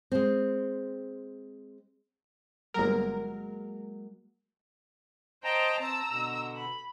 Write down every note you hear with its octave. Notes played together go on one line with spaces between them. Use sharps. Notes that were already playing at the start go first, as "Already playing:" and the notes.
G#3 C4
G1 F#3 G#3 A#3 A#4
C5 D#5 G5 A5 A#5
C4 A5 A#5 E6
B2 D3
B5